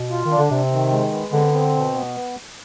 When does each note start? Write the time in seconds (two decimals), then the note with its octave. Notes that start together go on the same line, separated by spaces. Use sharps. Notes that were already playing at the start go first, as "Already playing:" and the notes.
Already playing: B2
0.11 F4
0.25 D#3
0.31 D4
0.38 D3
0.51 C3 C4
0.72 D#3
0.92 G#3
1.12 B3
1.33 D3 C4
1.53 C4
1.75 B2
1.94 B3